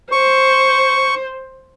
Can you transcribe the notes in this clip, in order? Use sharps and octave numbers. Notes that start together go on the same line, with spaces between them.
C5 C#6